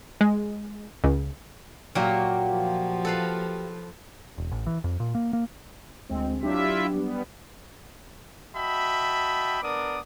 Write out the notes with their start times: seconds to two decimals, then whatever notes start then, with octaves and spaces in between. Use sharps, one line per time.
0.21 G#3
1.04 C#2
1.95 A#2 F#3 A#3 F#4 G4
2.49 F3
3.05 A4 B4 F5
4.38 E1
4.51 A1
4.67 E3
4.84 F2
5.00 A#2
5.15 A#3
5.33 A#3
6.09 D2 G#3 C4
6.43 F#3 D4 E4 F4 G4 E5
6.90 G3 B3
8.54 F#4 D#5 E5 G5 A5 B5
9.62 B3 D4 A#4 D5 D6 D#6